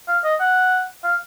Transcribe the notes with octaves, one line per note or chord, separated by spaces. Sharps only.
F5
D#5
F#5
F5